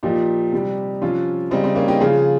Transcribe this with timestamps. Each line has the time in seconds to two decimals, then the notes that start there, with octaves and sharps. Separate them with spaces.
0.03 A#2 F3 D#4 G4
0.52 C3 G3
1.01 C3 F3 C#4 F4
1.51 C#3 G3 C4 D#4
1.64 C4 D#4
1.75 A#3 C#4
1.88 D#4 G4
2.00 C#3 F3 F4 G#4